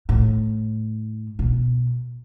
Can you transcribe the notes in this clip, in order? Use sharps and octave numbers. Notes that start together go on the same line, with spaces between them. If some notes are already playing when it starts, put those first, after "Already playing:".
A2
B2